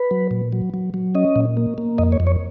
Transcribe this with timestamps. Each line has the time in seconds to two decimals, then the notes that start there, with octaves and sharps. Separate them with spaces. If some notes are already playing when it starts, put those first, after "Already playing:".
Already playing: B4
0.11 F#3
0.31 A#2
0.52 F#3
0.74 F#3
0.94 F#3
1.15 C#4 D#5
1.36 A#2
1.57 A#3
1.78 A#3
1.98 F2 D#5
2.12 C#5
2.20 F2
2.27 C#5